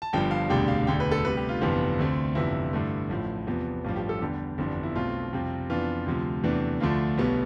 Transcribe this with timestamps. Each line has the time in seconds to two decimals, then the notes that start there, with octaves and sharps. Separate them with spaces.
0.02 A5
0.13 G1 G2 F3 G5
0.31 F5
0.50 E1 D2 C3 G3 D4 G5
0.68 F5
0.87 E1 D2 D3 G5
1.00 B4
1.11 A4
1.24 D2 C3 G3 B4
1.36 G4
1.49 F4
1.61 G1 F2 C3 E3 B3
1.99 D2 D3 A3 C4
2.35 G1 F2 C3 E3 E4
2.73 G2 D3 A3
3.09 A1 A2 F3
3.47 E2 C3 F3 B3
3.84 A1 G2 F3 F4
3.96 G4
4.09 A4
4.21 E2 D3 G3 D4 G4
4.58 G1 F2 E3 B3 D4
4.83 E4
4.95 B1 B2 A3 C4 F4
5.33 F2 C3 G3 C4
5.69 F2 E3 B3 D4 F4
6.06 D2 C3 F3
6.43 E2 C3 E3 A3 D4
6.80 D2 D3 F3 A3 D4 F4
7.18 B1 B2 G3 B3